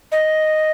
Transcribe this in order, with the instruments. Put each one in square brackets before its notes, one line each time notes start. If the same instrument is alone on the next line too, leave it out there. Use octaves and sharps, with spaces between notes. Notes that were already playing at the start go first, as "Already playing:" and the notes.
[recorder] D#5